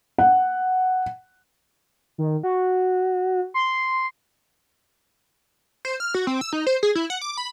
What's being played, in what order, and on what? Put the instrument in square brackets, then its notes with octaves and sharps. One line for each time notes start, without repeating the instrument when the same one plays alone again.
[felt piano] F#5
[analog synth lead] D#3
F#4
C6
[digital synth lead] C5
F6
F#4
C4
E6
D#4
C5
G#4
E4
F#5
D6
B5